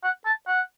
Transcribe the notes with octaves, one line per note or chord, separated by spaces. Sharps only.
F#5
A5
F#5